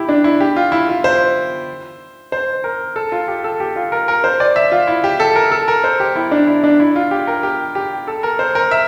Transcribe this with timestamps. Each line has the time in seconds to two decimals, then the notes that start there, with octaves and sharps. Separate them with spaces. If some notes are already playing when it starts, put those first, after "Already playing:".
Already playing: E4 G4
0.09 D4
0.24 E4
0.40 G4
0.56 F4
0.72 E4
0.88 F4
1.04 C5
2.32 C5
2.64 A#4
2.96 A4
3.12 F4
3.28 G4
3.44 A4
3.60 G4
3.76 F4
3.92 A#4
4.08 A#4
4.24 C5
4.40 D5
4.56 E5
4.72 F4
4.88 E4
5.04 G4
5.20 A4
5.36 A#4
5.52 A4
5.68 A#4
5.84 C5
6.00 G4
6.16 E4
6.31 D4
6.47 E4
6.63 D4
6.80 E4
6.96 F4
7.11 G4
7.27 A#4
7.43 G4
7.75 G4
8.07 A4
8.23 A#4
8.39 C5
8.55 A#4
8.71 E5